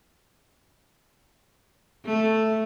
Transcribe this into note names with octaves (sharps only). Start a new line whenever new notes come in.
A3